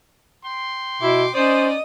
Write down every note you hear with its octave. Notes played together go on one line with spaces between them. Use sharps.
G5 C6
B2 E4 D6
C#4 D#4 C5 D5 D#5 D#6